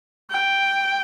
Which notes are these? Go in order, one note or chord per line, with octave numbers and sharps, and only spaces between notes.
G5